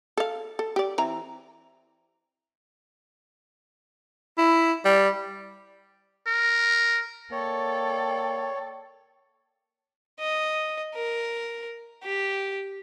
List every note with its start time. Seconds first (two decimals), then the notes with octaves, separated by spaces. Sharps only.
0.17 A4 F5
0.59 A4
0.76 G4 D5
0.98 E3 C4 A#5
4.38 E4
4.85 G3
6.27 A#4
7.32 A#3 A4 C#5 D5 G5
10.20 D#5
10.94 A#4
12.03 G4